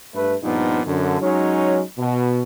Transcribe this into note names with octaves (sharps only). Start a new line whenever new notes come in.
G2 A3 B4
G2 A#2 F3 B3 D#4
F#2 D3
F#3 G#3 C#4 D#4 C#5
B2